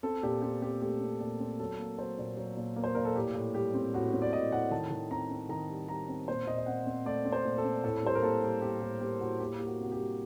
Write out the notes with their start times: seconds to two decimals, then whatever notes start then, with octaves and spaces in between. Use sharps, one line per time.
0.03 C4 A4
0.23 A#2 G4
0.42 C4 G4
0.62 C4 G4
0.81 A3 G4
1.00 C4
1.20 A#2 G4
1.40 C4
1.59 F#3 A4
1.79 A#3
1.98 F#3 C5
2.19 A#2
2.37 F#3
2.57 A#2
2.76 A#3
2.84 C5
2.95 A#2 A#4
3.05 A4
3.15 A2 G4
3.35 A2
3.54 G3 G4
3.74 C4
3.94 A2 F#4
4.13 C4
4.22 D5
4.33 A2 D#5
4.52 A2 F#5
4.71 D#3 A5
4.91 D#3
5.10 C4 A#5
5.30 C4
5.49 D#3 A#5
5.69 G3
5.88 G3 A#5
6.09 C4
6.28 A#2 C5
6.47 A#2 D#5
6.58 D#5
6.66 C4 F#5
6.86 C4
7.05 A3 D5
7.25 C4
7.32 C5
7.45 A#2
7.58 A4
7.64 C4
7.84 A2 A4
8.03 G3 C5
8.15 A#4
8.22 A#3 A4
8.42 G3
8.62 G3 G4
8.81 A2 G4
9.01 A#3 G4
9.20 A2 F#4
9.40 A#3 G4
9.59 A#3 G4
9.66 F#4
9.79 C3 F#4
9.92 G4
9.99 G3